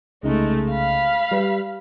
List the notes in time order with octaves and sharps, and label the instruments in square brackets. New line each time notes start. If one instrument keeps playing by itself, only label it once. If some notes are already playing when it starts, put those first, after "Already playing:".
[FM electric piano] C2 C#3 D#4 [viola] G#3 A3
[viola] F5 B5
[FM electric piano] G3 B4 B6